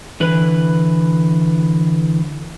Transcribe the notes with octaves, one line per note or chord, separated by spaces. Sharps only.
D3 E3 B4